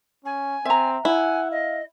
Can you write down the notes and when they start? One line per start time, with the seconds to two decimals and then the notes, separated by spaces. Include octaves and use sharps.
0.25 C#4 G#5
0.65 C4 E5 A#5
1.05 E4 F#5 G#5
1.51 D#5 F5